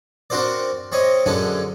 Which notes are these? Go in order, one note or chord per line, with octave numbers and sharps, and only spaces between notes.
C4 D4 F#4 A#4 C5 D5
G3 C4 C#5 D#5
F#2 D3 G#3 A3 C#4 D4